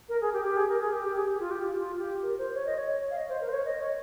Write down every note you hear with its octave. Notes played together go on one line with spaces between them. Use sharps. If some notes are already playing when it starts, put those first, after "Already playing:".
A#4
G#4
G4
G4
G#4
A#4
G#4
G4
G4
G#4
G4
F4
G4
F4
F4
G4
A#4
C5
C#5
D#5
C#5
F5
D#5
C5
A#4
C5
C#5
D#5
C#5